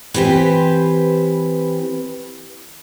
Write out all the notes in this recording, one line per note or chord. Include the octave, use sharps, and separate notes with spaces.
E3 C4 G4 B4 C5